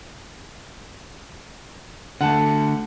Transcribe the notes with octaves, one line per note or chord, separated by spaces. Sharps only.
D3 A3 F#5 A5